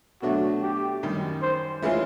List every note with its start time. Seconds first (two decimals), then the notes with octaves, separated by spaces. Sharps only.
0.22 B2 F#3 A3 D4 F#4
0.62 G4
1.03 F#2 D#3 G3
1.42 C5
1.82 E3 G#3 C#4 F4